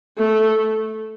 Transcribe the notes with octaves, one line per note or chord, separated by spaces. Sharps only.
A3